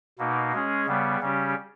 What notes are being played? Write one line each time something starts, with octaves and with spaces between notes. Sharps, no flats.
B2 A#3 D#4
G#3 C#4 G#4
C#3 G3 B3
C#3 G3 C#4 G4